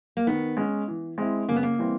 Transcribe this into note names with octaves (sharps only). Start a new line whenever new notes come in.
A#3
D#3 B3
G#3 C#4
E3
G#3 C4 E4
C#3 A#3
B3
A#3
E3 G3 C4 E4